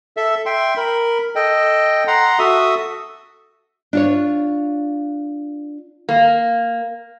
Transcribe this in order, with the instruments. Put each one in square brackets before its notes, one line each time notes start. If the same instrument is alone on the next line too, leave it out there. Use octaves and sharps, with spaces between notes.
[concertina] A4 E5
E5 G5 C6
A#4 B5
A4 D#5 G5
F#5 A#5 C6
F#4 A4 E5 D#6
[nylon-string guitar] D4 F4 C#5
[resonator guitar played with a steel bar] A#3